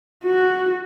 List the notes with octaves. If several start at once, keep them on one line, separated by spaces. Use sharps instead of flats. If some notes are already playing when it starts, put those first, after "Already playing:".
F#4